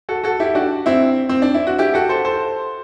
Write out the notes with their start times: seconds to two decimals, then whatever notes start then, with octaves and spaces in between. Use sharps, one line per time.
0.09 F#4 A4
0.24 F#4 A4
0.40 E4 G4
0.55 D4 F#4
0.86 C4 E4
1.29 C4
1.42 D4
1.54 E4
1.67 F#4
1.79 E4 G4
1.94 F#4 A4
2.09 A4 C5
2.25 A4 C5